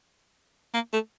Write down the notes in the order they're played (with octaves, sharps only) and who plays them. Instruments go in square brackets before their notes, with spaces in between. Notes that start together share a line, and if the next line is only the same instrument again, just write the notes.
[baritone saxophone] A#3
A3